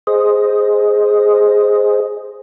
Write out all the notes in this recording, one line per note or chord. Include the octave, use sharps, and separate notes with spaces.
G#4 C5 D#5